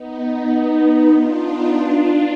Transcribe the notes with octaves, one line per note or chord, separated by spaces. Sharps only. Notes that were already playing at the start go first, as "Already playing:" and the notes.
Already playing: B3 D#4
B3 D#4
D4 F4
B3 D#4
D4 F4